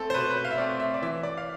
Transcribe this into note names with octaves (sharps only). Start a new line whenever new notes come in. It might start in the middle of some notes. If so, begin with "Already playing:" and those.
Already playing: A3 C4 A4
C5
B2 B4
B4
C5
F5
E5
A3 C4 D5
E5
D5
E3 E5
D5
F5